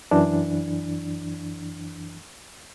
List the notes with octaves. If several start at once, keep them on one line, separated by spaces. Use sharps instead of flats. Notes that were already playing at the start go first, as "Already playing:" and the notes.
F#2 E3 D4